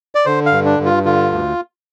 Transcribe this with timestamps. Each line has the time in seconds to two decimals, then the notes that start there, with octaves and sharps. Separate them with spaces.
0.15 D5
0.26 D3 C5
0.46 F5
0.52 G2
0.65 D4
0.79 G2
0.85 F4
1.05 D3 F4
1.32 D2